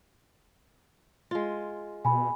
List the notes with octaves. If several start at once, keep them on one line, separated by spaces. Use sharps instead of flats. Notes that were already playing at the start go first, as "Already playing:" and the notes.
G#3 F4
B2 G#5 B5